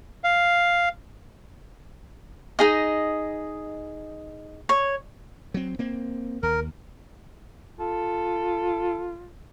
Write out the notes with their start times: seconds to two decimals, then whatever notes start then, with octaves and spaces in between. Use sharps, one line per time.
0.24 F5
2.59 D#4 G#4 D#5
4.69 C#5
5.54 F#3 C4
5.79 A#3 C4
6.43 D#2 A#4
7.80 F4 A4